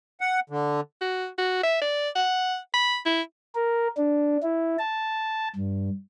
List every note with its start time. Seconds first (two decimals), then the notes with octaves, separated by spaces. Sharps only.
0.21 F#5
0.50 D3
1.01 F#4
1.38 F#4
1.63 E5
1.82 D5
2.15 F#5
2.74 B5
3.06 E4
3.55 A#4
3.97 D4
4.42 E4
4.79 A5
5.56 G2